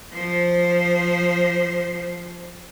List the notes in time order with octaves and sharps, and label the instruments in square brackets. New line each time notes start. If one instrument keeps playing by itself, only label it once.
[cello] F3 C5